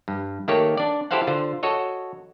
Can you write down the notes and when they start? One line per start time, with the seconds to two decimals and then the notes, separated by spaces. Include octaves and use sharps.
0.08 G2
0.48 D#3 A3 A#3 G4 C#5
0.77 D4 D5
1.11 E4 G4 A4 C5 F5 F#5
1.27 D3 F4 C5
1.63 F#4 A4 C#5 D#5